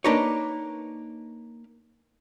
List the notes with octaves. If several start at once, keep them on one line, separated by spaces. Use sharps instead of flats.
A#3 D4 D#4 B4 C#5